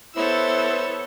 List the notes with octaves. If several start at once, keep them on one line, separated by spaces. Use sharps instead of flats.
B3 E4 A4 C5 C#5 E6